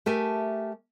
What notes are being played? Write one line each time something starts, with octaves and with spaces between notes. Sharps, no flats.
A3 G4 A#4 E5 G#5 A5